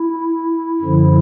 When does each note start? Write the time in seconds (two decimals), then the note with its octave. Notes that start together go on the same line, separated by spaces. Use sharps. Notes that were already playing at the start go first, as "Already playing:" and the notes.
Already playing: E4
0.82 F#2 D3 F3